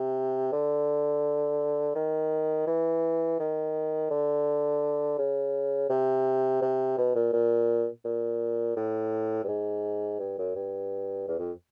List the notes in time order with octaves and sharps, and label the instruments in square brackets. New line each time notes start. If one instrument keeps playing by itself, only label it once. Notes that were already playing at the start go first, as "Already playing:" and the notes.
Already playing: [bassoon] C3
D3
D#3
E3
D#3
D3
C#3
C3
C3
B2
A#2
A#2
A#2
A2
G2
G#2
G2
F#2
G2
E2
F2